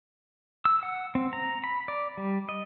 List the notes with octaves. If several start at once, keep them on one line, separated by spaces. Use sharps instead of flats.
E6
F#5
C4
A#5
B5
D5
G3
D#5